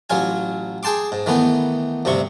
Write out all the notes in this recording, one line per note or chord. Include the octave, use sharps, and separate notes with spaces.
A1 F#3 F4 G#5
G#4 G5 A5 C6 D6
G#2
D#3 E3 A3 B3
D2 G2 C3 C4 C#6